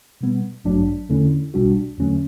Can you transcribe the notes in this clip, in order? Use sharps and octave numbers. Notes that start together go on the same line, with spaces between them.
B2 G3 B3
A1 G2 F#3 A3 D4
E2 D3 A3 C#4 E4
B1 B2 G3 D4 F#4
E2 D3 F#3 A3 C#4